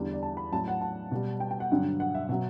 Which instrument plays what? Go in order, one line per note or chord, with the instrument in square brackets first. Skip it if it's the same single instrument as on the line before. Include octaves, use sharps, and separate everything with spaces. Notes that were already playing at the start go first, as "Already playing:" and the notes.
Already playing: [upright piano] E2 D3 G3
D5
A5
B5
A2 F#3 A5
F#5
A5
B2 G3
G5
G5
F#5
G2 D3 F#3
F#5
E5
B2 F#3 F#5